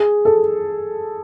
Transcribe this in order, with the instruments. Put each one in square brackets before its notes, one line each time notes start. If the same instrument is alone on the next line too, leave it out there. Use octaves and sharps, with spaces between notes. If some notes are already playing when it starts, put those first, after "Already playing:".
Already playing: [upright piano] G#4
A4